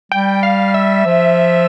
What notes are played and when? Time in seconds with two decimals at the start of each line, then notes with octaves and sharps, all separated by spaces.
0.12 G3 G5
0.43 F5
0.74 E5
1.06 F3